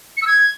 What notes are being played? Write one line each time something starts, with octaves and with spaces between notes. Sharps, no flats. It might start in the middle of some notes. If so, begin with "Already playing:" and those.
C#7
E6
G#6